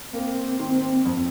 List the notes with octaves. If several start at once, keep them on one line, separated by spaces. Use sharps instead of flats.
A#3 C4
D#3
F2